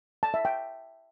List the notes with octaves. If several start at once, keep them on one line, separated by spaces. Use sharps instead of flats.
A5
E5
G5